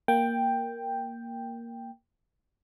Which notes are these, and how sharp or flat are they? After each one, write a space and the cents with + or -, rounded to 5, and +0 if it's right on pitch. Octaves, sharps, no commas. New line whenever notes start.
A#3 +0 G5 +5